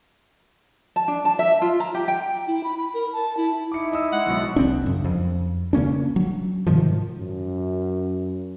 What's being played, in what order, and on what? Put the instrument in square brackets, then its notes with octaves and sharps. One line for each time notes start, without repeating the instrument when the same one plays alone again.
[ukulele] A5
D4
A5
E5
F4
A#5
G4
G5
[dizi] E4
B5
B5
A#4
A5
E4
[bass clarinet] D#4 [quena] E4 [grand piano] D6 C#7
[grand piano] D#5 D#6 E6
[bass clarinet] G#3 [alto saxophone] F#5
[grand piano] B1 B2 F#3
[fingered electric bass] C2 C4 D4
F#2 C#3
F2
C#3 A#3 C#4 D4
F#3
G#2 C3 D#3 F3
[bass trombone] F#2